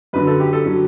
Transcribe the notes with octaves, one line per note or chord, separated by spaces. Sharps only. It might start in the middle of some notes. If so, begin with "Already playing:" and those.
F#2 D3 F#3 B4
A4
G4
A4
D3 F#3